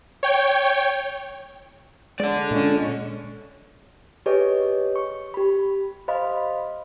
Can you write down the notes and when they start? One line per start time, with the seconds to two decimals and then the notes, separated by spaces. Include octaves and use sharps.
0.23 C#5 G5
2.20 G#3 A4 D5
2.51 A#2 G#3 C#4
4.26 G4 G#4 B4 C#5 D#5
4.96 C#6
5.34 G4 B5
6.08 C5 D#5 F5 B5